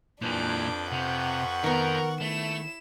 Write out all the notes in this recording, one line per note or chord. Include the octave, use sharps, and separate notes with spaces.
F2 A#2 E3 D4 B4 D6 G6
C3 F#5 C#6
D#3 B3 A#4
A3 E4 E7